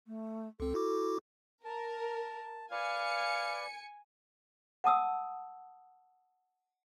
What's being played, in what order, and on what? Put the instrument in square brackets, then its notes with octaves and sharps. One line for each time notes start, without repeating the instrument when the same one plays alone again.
[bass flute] A3
[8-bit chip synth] C#2 C4 [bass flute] A4
[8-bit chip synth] E4 F#4 D6
[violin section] A#4 [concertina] A5
[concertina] B4 D5 [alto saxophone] F5 [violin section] G#5 C#7
[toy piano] F#5 A5 D#6 E6